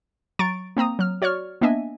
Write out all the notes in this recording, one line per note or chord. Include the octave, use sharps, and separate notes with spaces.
F#3 A#5 C#6 A6 D7
A#3 C4 A#5 D#6
F#3 F6
F#4 C#5 D5 C#6 F6
A#3 B3 D4 D#5 E5 G#5